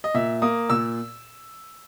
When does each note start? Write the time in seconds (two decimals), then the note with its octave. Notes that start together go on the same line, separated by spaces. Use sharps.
0.04 D#5
0.14 A#2 E5
0.42 A#3 D#6
0.70 A#2 E6